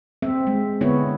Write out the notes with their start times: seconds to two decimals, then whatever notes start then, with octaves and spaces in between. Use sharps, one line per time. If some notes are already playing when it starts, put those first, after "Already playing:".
0.22 C4 E5
0.47 G#3
0.81 D3 B3 E4 C#5